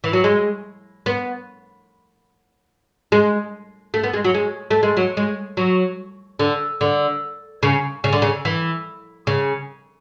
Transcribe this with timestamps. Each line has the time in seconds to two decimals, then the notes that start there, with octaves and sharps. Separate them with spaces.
0.04 E3
0.13 F#3
0.24 G#3
1.06 B3
3.12 G#3
3.94 A3
4.03 B3
4.13 G#3
4.24 F#3
4.34 G#3
4.70 A3
4.83 G#3
4.97 F#3
5.17 G#3
5.57 F#3
6.39 D3
6.81 D3
7.63 C#3
8.04 C#3
8.13 D3
8.22 C#3
8.45 E3
9.27 C#3